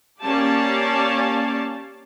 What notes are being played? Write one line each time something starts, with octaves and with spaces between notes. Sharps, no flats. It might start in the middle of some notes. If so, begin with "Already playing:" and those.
A#3 C#4 G4 D5 F5 A5